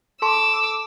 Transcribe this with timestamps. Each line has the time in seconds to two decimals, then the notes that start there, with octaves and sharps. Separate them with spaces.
0.22 A4 A5 C6 D6 E6